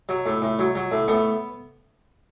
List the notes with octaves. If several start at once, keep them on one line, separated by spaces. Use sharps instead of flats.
F#3
A2
A2
F#3
F#3
A2
A2 B3